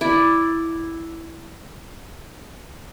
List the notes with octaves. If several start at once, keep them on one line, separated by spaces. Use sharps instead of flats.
E4 D5